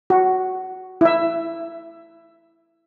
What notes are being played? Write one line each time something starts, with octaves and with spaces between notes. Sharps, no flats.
F#4
E4 E5